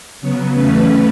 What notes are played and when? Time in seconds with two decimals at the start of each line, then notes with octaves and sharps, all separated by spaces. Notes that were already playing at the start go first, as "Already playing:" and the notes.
0.21 C#3 F#3 B3 C#5
0.54 E2 C#3 E3 A3 C#4 B4